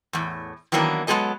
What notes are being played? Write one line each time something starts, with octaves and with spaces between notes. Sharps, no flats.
E2 A2
D#3 E3 F#3 A#3 B3 D4
F#3 G#3 B3 G#4 A4 D#5